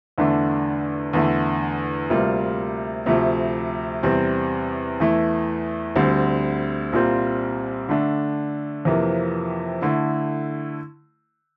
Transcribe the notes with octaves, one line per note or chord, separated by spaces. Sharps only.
E2 D3 A3 D4
E2 D3 A3
D2 C3 G3 A#3 F4
D2 C3 F3 A3
E2 C3 G3 C4
E2 E3 A3 E4
D2 D3 G3 C4
C2 A#2 G3 C4 F4
D3 A3 D4
F2 C3 E3 A#3
D3 A3 E4